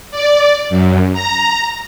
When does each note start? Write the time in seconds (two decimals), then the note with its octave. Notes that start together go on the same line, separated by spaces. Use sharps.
0.11 D5
0.70 F#2
1.13 A#5